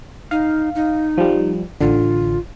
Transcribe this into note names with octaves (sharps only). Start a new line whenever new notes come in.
D#4 F5
D#4
F3 G3
A1 D3 F4